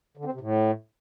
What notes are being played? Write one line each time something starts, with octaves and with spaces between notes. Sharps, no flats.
D3
C4
C3
A2